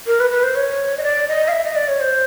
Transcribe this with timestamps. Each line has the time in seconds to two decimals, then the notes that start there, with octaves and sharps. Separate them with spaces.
0.07 A#4
0.20 B4
0.31 B4
0.43 C5
0.55 C#5
0.98 D#5
1.03 D5
1.28 D#5
1.48 F5
1.51 E5
1.64 D#5
1.75 D5
1.88 C#5
2.00 C5